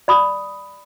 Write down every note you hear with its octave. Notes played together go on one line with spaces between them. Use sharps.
D5 B5 D#6